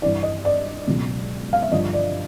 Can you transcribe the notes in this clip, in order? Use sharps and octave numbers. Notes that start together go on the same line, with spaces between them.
G2 E3 D5
D#5
D5
C#2 B2 F#3
F5
E5
G2 D3 F3 D#5
D5